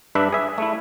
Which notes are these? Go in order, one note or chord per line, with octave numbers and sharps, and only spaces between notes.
G2 D4 B4 E5
G#4 E5
A3 E4